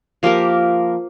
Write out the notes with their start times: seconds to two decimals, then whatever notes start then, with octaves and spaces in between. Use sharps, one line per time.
0.23 F3 A#3 G4 A#4